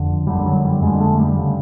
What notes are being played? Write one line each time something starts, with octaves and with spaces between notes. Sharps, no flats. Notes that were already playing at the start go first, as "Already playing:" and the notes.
Already playing: F2 D3
F#2 D3 G3
F#3
G3
F2 D3 G#3
A3
G3
C#3